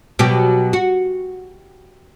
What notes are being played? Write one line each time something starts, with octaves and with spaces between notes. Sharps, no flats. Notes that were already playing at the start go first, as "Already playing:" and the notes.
B2 F#3 G4
F#4